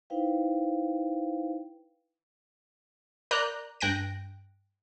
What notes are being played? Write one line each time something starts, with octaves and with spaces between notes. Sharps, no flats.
D#4 E4 B4 C5 F5 G5
A#4 D5 A#5 F#6 G6
G2 G5 F#6 A#6 D7